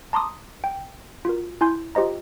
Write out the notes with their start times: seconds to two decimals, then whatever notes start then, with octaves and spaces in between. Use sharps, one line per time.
0.13 A5 A#5 C6 D6 D#6
0.64 G5
1.25 F4 F#4 A#4
1.61 E4 G#5 C6 G6
1.95 F4 G4 C5 D#5 A#5